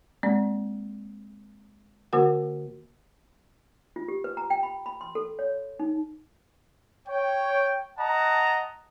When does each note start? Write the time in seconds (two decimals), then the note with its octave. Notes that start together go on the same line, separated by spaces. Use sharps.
0.23 G#3 A#3 C4 D5
2.13 D3 A#3 F#4 A#4 F#5
3.96 F4
4.08 G4
4.24 B4
4.37 A#5
4.50 G5
4.63 B5
4.86 B5
5.01 C6
5.15 A4
5.39 C#5
5.80 D#4
7.07 C#5 G5
7.98 D#5 F#5 A5 A#5